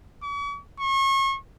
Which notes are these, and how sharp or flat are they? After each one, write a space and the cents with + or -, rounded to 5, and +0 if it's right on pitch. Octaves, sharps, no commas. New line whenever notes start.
C#6 +45
C#6 -35